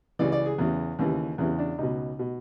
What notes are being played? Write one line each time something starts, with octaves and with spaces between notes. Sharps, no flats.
C#2 C#3 E3 D5
D5
G#4
E2 C#3 E3
D#2 C#3 E3
E2 C#3 E3
D4
C#2 B2 D#4
B2